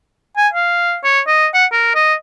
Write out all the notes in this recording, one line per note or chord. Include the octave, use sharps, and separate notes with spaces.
G#5
F5
C#5
D#5
F#5
A#4
D#5